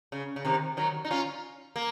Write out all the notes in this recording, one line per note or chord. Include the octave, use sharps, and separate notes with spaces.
C#3
C#3
C3 D#3
D#3 F#3
D#4
C#4 F4
A#3